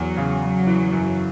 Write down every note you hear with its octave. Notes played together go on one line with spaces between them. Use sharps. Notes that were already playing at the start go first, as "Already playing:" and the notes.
Already playing: E2 F#3
C#3
C#3 F#3
E3
F#2